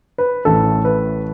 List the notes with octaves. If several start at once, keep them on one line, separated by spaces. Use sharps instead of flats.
B4
A1 A2 A3 A4
B4